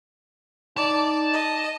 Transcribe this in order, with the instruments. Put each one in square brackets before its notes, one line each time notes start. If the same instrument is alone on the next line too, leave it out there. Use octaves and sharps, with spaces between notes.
[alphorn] D#4 [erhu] D5 [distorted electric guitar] A5
[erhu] D#5